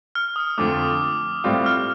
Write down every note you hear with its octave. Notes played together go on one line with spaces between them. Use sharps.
F6
D#6
F2 D3 F3 A3 D6
A2 G3 C4 F4
F6